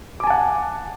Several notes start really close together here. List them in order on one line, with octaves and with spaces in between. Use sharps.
D6 G#5 A5 F#5